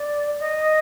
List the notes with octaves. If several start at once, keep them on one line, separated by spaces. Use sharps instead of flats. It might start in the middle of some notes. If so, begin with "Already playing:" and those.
Already playing: D5
D#5